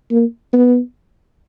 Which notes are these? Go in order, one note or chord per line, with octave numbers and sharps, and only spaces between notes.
A#3
B3